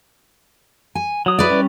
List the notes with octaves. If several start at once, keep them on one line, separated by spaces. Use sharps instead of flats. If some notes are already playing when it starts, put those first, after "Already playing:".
G#5
F#3 D#6
E4 B4 D5
G3 C#4